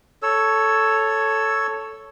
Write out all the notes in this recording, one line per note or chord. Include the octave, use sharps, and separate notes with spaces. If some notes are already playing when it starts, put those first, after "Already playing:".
A4 C#5 E6